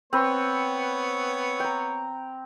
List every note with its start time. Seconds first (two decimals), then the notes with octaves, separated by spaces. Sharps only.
0.13 B3 C4 B4 C#5
1.60 G5 A#5